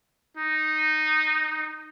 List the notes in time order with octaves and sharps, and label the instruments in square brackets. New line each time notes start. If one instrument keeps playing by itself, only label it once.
[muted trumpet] D#4